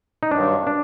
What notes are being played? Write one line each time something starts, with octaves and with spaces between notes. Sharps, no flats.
D#4
G2 D#3 F#3 D4
D4